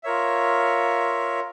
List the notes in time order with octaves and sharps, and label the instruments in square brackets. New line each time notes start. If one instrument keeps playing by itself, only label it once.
[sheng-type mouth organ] F4 A#4 C#5 E5